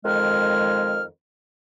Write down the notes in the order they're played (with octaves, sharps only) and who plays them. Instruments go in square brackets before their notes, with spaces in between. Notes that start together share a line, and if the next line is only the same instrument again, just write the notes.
[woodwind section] F2 D#3 G#3 F6